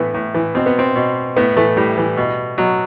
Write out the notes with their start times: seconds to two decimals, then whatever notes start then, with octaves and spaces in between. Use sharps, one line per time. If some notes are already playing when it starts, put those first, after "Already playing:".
Already playing: A2 E3 A3 B3
0.14 A2
0.34 E3
0.55 B2 C4
0.66 B3
0.79 C4
0.96 B2
1.36 A2 B3
1.56 E3 A3
1.77 A2 G3
1.98 E3
2.17 B2
2.58 B2 F#3